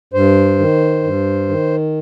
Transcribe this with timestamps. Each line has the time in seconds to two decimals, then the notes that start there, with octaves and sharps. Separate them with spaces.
0.13 G2 C5
0.59 D#3
1.04 G2
1.49 D#3